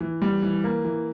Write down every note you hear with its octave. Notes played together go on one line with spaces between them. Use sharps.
E3
G3
E3
A#3
E3